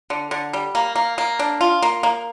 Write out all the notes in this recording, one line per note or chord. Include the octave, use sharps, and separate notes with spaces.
D3
D3
G3
A#3
A#3
A#3
D4
F4
A#3
A#3